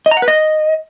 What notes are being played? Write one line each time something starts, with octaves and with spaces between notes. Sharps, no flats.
D#5
A#5
F#5
B4
D#5